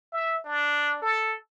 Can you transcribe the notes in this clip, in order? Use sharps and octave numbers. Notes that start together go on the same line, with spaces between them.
E5
D4
A4